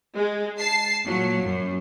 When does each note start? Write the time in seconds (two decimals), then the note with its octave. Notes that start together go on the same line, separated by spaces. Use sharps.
0.15 G#3
0.58 A5 C7
1.05 A#2 F#3
1.41 F#2